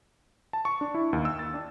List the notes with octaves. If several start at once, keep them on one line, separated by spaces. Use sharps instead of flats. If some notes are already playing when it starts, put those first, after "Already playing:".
A5
C#6
D4
E4
D#2
E6
A6
D4